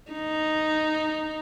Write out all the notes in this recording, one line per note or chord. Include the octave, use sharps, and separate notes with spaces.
D#4